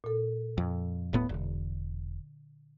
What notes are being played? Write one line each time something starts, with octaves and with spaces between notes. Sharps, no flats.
A#2 A4
F2
D1 A2 B3
E1 D3